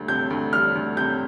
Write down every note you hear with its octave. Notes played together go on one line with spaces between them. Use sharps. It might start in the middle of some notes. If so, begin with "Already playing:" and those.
Already playing: D2 G3
C3 G6
D2
G3 F6
D2
C3 G6